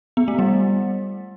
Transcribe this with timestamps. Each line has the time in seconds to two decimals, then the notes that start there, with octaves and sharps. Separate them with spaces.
0.17 B3
0.28 A3
0.39 G3